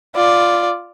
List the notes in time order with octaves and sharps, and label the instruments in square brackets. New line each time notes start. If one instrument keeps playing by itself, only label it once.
[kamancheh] F4 D5